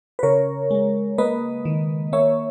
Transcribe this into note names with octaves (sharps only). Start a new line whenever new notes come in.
B4
C#3 A#4 C#5
G#3
A#3 B4 D#5
D#3
A#3 C#5 E5